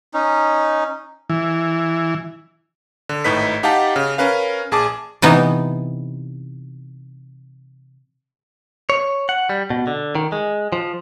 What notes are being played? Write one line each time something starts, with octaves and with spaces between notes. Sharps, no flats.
C#4 D#4
E3
D3
G#1 A2 D#4 B4 B6
D#4 G4 F5 F#5 A5
C#3
C#4 A#4 B4 F5
A#1 G#4 A5 D6
C3 E3 B3 D#4
C#5
F#5
G3
B2
D3
D#3
G#3
F3